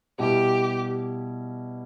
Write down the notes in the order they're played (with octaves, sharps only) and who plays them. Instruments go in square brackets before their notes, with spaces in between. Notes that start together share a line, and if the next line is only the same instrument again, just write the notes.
[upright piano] B2 G3 E4 [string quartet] G4